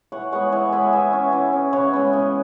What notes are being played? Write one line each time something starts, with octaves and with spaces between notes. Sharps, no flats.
E3 C#5 F#5
G#3 B3 C#5 F#5
E3 C#5 F#5
G#3 B3 E5 G#5
E3 E5 G#5
C#4
E3
C#4
C#3 C#5 F#5
G#3 B3
C#3